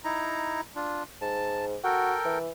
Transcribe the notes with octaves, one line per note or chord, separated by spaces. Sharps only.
D#4 E4 A#5
D4 F4
G#2 A5
F#4 A4 A#4 G5
E3